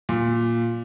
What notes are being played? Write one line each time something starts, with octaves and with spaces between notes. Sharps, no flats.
A#2